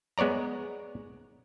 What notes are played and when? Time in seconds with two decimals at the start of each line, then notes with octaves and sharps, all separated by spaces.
0.18 G#3 B3 C#5 D5 A#5